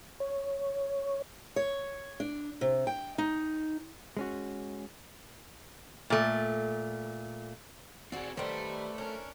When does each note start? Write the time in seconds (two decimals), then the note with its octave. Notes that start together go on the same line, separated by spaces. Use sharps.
0.20 C#5
1.56 C#5
2.20 D4
2.61 C3
2.87 G5
3.18 D#4
4.17 G#3 C#4 F#4
6.10 A#2 A3
8.12 C4 F#4 G#4 D5 F#5
8.37 D#3 G3 A3 A4 B4 C5 D5
8.98 C#4 D4 A#4 C#5